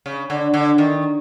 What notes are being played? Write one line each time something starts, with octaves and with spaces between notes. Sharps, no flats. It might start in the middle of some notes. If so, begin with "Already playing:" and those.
C#3
D3
D3
D#3